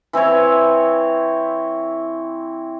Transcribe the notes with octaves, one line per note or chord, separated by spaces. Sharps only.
E3 C4 E4 C#5